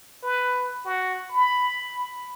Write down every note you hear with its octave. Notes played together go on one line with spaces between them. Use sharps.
B4
F#4
B5